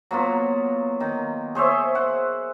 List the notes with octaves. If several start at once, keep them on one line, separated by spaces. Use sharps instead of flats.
F#3 A#3 B3 F4
D#3
G#4 C5 C#5 E5
C5 F#5